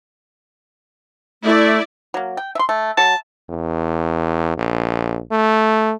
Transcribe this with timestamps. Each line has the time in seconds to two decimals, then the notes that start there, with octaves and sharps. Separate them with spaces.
1.43 A3 E4 D5
2.14 F#3 A#3
2.37 G5
2.55 E5 C6
2.69 A3
2.98 F#3 A5
3.49 E2
4.57 A#1
5.31 A3